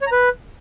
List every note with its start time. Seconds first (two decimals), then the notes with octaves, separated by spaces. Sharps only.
0.02 C#5
0.07 A#5
0.12 B4